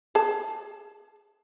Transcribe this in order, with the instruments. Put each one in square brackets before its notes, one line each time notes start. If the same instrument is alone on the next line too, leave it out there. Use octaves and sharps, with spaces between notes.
[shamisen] G#4 A5